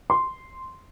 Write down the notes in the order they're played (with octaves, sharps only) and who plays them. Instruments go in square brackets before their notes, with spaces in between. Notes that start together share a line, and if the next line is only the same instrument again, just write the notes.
[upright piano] C6